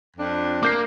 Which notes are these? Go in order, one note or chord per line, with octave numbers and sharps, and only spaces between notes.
F2 D4
A#3 D6 G6 C7